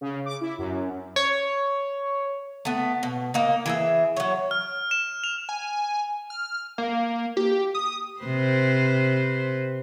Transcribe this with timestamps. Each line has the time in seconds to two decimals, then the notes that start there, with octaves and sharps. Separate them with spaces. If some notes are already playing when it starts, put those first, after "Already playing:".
0.01 C#3
0.26 D6
0.41 E4
0.58 F#2
1.16 C#5
2.65 A3 B3
3.03 B2
3.34 A#3 D#4
3.66 E3 G#4 E5
4.16 F#3 C#5
4.51 F6
4.91 E7
5.24 F7
5.49 G#5
6.30 F6
6.78 A#3
7.37 G4
7.75 D#6
8.21 C3 B4 C5